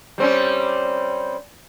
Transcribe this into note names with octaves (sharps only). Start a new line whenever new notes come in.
G3 C4 C#4